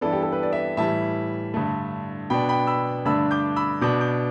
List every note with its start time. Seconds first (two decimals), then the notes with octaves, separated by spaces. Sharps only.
0.01 G2 E3 B3 A4 D5
0.13 G4
0.23 A4
0.32 B4
0.43 D5
0.52 B4 E5
0.77 A2 E3 G3 E5 A5
1.54 G2 D3 A3
2.30 B2 B3 D4 G5 B5
2.49 G5 B5
2.67 B5 E6
3.05 G2 D3 A3 D4 B5 E6
3.31 D6 G6
3.56 B5 E6
3.81 B2 B3 D4 D6 G6
4.01 D6 G6